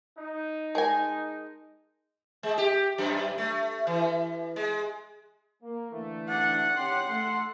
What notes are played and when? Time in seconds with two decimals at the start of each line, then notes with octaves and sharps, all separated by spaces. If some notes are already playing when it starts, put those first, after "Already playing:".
0.18 D#4
0.75 G#3 A#4 G#5 A5
2.43 G#3
2.58 G4
2.98 F#2
3.38 A3
3.87 E3
4.56 G#3
5.63 A#3
5.92 D3 E3 A3
6.29 D4 F#5
6.77 C#4 G4 C6
7.08 A3 A4 C6